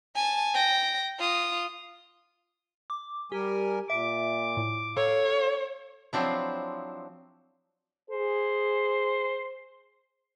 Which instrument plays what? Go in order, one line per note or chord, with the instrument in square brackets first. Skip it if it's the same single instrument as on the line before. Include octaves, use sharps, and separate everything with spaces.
[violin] G#5 A5
G5 A#6
F4 D#6
[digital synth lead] D6
[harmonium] G3 A#4 G#5 [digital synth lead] G4
[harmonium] A#2 [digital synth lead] E5 [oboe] D6
[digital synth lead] A2
[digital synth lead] A4 [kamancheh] C#5 [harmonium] F5
[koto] F3 F#3 C4 D4 E4
[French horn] G#4 [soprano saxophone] C5